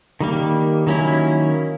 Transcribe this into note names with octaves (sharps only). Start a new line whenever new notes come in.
D#3 G3 A#3
D#3 F#3 A#3 C#4 E4